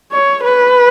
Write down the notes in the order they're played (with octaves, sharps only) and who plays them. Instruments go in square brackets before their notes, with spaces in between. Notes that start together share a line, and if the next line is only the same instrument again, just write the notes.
[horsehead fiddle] C#5
B4